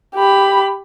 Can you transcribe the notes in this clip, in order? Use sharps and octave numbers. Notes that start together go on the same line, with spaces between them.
G4 B5